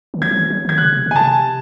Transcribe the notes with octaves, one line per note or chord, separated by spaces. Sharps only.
D#3
E3 G#6
F#3
E3
F#3
D#3 G#6
C#3 F#6
C3
C#3
G#5
A5
C3